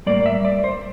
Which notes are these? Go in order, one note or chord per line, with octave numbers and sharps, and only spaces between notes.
A2 G3 A#3 D5
E5
D5
C5